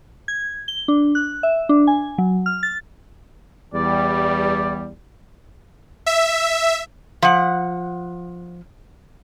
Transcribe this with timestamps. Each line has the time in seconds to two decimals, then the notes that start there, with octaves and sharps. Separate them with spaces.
0.28 G#6
0.68 G7
0.88 D4
1.15 F#6
1.43 E5
1.69 D4
1.87 G#5
2.18 F#3
2.46 F6
2.63 A6
3.74 E2 G3 D5
6.06 E5
7.22 F3 F#5